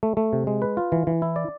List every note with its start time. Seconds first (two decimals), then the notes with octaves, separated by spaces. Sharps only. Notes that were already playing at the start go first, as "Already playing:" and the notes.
0.03 A3
0.17 A3
0.33 C3
0.47 G#3
0.62 B4
0.77 F4
0.92 E3
1.07 E3
1.22 E4
1.36 D5